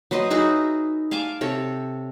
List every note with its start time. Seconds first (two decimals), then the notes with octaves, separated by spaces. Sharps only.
0.11 F#3 B4 C5 D#5
0.30 D#4 E4 F#4 G#4
1.11 F5 G#5 A5 D6
1.41 C3 A4 C#5